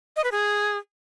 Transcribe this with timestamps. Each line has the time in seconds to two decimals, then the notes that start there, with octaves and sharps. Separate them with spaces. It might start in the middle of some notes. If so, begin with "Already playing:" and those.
0.16 D#5
0.24 B4
0.32 G#4